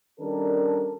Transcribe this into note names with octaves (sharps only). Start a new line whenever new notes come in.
D#3 G3 C#4 D4 A4 A#4